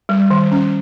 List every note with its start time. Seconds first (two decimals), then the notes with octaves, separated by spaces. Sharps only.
0.09 G3
0.30 D#3
0.52 C#4